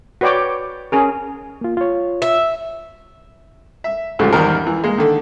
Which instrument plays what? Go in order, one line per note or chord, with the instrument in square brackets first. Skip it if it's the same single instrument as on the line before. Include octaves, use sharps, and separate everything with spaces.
[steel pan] F#4 B4 C#5 D5 G5 D6
C#4 G#4 A#4
[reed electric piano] A#3 F4
F4 C#5
[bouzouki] E5
[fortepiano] E5
D2 G#2 C#3 F3 A3 G4
E2 G#2 D#3 G3 A#4
E3
G#3 A#3
D3 D#3